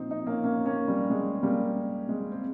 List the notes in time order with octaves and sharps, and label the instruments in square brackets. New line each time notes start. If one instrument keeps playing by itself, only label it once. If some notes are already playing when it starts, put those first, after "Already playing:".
Already playing: [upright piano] A#2 F3 C4 D#4
C4 D#4
A#3 C#4
A#3 C#4
A#3 C#4
G3
G#3
G3 A#3
G#3
C4